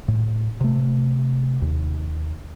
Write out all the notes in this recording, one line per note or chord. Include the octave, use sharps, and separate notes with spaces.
A2
C3 A3
D#2